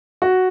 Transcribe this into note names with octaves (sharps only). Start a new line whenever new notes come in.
F#4